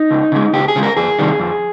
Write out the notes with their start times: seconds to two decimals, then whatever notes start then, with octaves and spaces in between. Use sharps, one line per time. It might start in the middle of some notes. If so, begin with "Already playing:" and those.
Already playing: D#4
0.11 C#2
0.32 C#3 G#3
0.53 C#2 G4
0.68 G#4
0.76 C#3 G#3
0.83 A#4
0.97 F2 G#4
1.19 C3 D#3 G3
1.40 F2